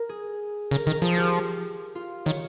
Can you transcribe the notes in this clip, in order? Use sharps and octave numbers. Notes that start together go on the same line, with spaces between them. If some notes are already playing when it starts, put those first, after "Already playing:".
Already playing: A#4
G#4
C#3 A#4
D#3 A#4
F3 G#4
G4
F4
D#3 C#5